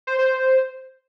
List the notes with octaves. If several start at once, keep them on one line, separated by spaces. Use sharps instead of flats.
C5
C5
C5